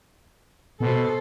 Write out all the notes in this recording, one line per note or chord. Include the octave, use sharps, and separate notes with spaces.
B2 A4 C5